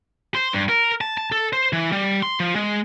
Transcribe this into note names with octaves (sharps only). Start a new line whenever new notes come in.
C5
G2
A#4
A5
A5
A4
C5
E3
G3
C6
F3
G#3